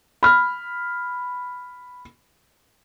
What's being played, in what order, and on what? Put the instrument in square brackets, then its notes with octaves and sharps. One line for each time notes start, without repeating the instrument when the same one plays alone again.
[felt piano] B5 F6